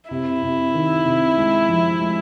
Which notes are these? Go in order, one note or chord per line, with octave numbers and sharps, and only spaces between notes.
C3 E4
C3
D#3
C3
G#3
F3
G#3